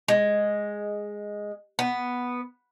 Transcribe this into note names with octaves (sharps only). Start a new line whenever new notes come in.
G#3
B3